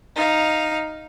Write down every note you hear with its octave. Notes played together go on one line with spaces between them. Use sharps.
D#4 F5